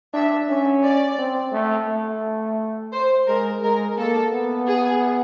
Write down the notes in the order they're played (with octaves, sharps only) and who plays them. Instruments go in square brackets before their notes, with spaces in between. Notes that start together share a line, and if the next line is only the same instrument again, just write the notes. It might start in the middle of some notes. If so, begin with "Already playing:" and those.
[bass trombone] D4 [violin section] E5
[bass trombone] C#4 [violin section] E5
[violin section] D5
[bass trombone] C4
A3
A3
[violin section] C5
[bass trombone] G#3 [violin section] A#4
[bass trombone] G#3 [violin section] A#4
[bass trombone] A#3 [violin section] A4
[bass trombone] B3
[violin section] G#4